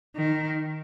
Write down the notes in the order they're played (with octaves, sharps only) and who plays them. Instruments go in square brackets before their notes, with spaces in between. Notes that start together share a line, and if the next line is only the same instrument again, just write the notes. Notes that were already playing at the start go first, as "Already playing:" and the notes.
[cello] D#3